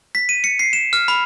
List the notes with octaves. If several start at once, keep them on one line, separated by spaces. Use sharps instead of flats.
B6
D#7
C#7
C7
E7
F6
B5